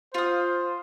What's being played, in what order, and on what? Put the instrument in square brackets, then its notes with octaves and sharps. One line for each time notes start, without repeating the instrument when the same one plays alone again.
[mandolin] F4 D#6 [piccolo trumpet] C5